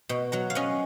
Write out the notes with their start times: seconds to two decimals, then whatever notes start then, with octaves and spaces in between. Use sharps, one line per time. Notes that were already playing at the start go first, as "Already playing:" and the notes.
0.09 B2
0.32 F#3 F#5 A#5
0.50 F5
0.55 C#4 D#5 F#5